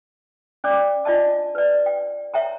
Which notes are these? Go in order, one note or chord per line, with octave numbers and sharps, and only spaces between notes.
C#4 D5 D6
D4 F4 D5 D#5 A5
B4 D5
G5
C#5 E5 G5 A#5